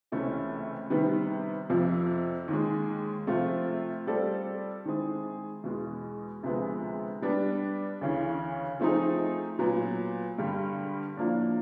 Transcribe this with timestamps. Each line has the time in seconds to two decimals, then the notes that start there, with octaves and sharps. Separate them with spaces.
0.12 C#2 C3 E3 A3 C#4
0.90 C3 D#3 G3 B3
1.70 F2 C3 F3
2.48 D#2 D#3 G#3
3.27 C3 F3 A3 C4 F4
4.06 G3 C4 F4 A4 D5
4.85 D#3 G#3 C4 E4 G#4
5.64 E2 B2 G#3
6.43 D2 C3 F3 G#3 B3
7.22 G3 B3 D4
8.01 D2 C#3 E3
8.80 F3 A3 C4 D#4 G#4
9.59 A#2 F#3 B3
10.38 G2 D3 G3
11.17 A2 F3 A#3 D4